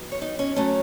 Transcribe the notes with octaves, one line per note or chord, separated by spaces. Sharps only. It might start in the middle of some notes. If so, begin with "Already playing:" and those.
Already playing: E2 D#3 F#3 B3
C#5
D#4
C#4
F#3 A3 C#4